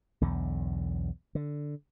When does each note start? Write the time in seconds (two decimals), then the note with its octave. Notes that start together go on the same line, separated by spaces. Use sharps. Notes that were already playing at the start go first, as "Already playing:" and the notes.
0.21 B1 E2 D3
1.35 D3